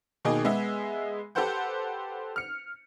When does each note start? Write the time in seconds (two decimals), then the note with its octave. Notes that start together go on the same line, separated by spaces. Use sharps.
0.25 B2 D#3 A#3 G#4 D#5
0.45 G#3 B3 G#4 E5
1.35 G4 A4 B4 C5 F#5 G6
2.36 F6 C#7